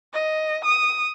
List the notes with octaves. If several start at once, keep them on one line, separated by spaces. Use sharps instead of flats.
D#5
D#6